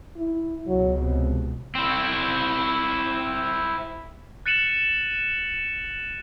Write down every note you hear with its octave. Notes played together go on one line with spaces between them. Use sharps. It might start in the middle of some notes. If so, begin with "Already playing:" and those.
E4
C#2 B2 F#3
C3
C4 E4
F#6 A6 C#7 D#7 E7 F#7